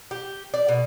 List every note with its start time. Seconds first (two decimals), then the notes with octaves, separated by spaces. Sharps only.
0.11 G4
0.54 D5
0.68 B2